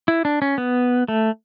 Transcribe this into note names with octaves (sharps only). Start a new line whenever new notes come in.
E4
D4
C#4
B3
A3